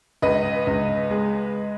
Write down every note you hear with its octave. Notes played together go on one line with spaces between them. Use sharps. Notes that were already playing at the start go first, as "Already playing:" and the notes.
C#2 B4 D#5
C#2
G#3